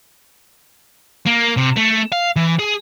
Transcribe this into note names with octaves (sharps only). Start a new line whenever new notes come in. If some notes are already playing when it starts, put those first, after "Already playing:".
A#3
C3
A3
F5
E3
G#4